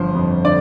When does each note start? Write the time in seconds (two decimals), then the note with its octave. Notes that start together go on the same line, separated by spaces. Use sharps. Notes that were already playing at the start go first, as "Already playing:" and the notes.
Already playing: G1 F3 C5
0.15 F2
0.45 D3 D5